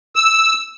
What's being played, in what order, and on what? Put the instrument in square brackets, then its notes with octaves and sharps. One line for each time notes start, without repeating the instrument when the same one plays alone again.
[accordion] E6